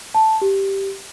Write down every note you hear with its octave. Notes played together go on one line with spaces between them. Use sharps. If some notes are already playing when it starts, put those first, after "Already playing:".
A5
G4